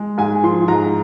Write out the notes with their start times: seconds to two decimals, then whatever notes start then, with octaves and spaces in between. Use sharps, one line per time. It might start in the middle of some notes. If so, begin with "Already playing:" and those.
Already playing: G#3
0.18 G#2 G#5
0.43 F3 C6
0.68 G#2 A#5